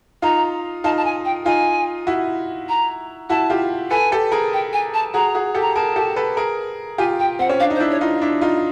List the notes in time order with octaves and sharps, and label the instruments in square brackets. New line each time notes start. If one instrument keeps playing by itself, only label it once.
[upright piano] D#4 F4 [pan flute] A#5
[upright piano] D#4 F4 [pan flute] A5
[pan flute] A5
G#5
G5
[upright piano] D#4 F4 [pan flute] G#5
[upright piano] E4 F#4
[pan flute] A#5
[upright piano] E4 F#4 [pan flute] A5
[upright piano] F4 G4
[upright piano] A4 B4 [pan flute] G#5
[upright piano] G4 A4
G#4 A#4
[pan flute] G5
G#5
A5
[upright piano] F#4 G#4 [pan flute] A#5
[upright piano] F#4 G#4
G4 A4
[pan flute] A#5
[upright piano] G#4 A#4 [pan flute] A5
[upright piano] G4 A4
A4 B4
G#4 A#4
[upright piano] F4 G4 [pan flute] G#5
[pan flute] G5
[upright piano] C4 [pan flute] F#5
[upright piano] C#4
[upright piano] D4 [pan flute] F5
[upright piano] D#4 [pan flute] C5
[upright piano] D4 E4
[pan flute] C#5
[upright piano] D#4 F4
D4 E4
D#4 F4